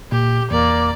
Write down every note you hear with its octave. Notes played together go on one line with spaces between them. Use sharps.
A#2 G4
E2 A#3 D5